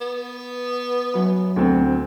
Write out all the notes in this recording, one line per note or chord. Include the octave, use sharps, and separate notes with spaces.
B3
F#2 F#3 B4
D2 C4